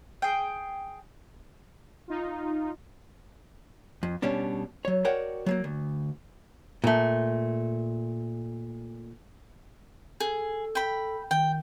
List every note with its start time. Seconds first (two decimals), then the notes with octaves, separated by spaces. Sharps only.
0.22 G#4 G5
2.08 D#4 F4
4.03 F2
4.22 B2 G3 C#4 D4
4.85 F#3 C#5
5.05 F#4 A#4 C#5 D5 F#5 G5
5.46 F#3 G#3 A#3
5.64 D2
6.84 A#2 A3
10.20 G#4 A4
10.75 G5 B5
11.31 D#3 G5